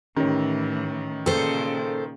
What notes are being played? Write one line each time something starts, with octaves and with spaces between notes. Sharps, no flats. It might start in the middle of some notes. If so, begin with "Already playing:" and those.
A2 D#3 E3 C#4 C#5
A#2 C#3 A4 C5 G5